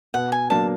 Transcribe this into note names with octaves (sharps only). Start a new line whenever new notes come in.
B2 F#5
G#5
F#3 A#3 D4 A5